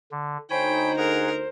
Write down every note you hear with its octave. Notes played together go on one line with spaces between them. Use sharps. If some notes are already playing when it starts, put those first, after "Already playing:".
D3
D2 D3 D#4 C5 C#5 G5 G#5 B5
G#4 A#4 F#5